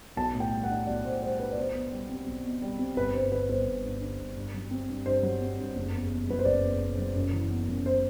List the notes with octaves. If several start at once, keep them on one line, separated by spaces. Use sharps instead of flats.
B1 A5
A2
G5
G3
F#5
D4
B1 D5
A2 C5
G3 C5
D4 B4
D5
B1 C5
B2
G3
C4
B1
B2
G3
C4
G1 B4
G2 C5
D3 B4
G1 C5
G1
G2
D3
G1
G2
F#3
C4
G2
G2 C5
F#3
C4
G2
F#1
E2
B2
F#3 B4
C5
F#1 D5
E2
B2
F#3
F#2
E3
B3
F#2
C5